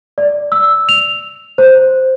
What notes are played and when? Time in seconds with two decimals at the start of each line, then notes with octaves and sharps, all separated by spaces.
0.18 D5
0.52 E6
0.89 F7
1.58 C5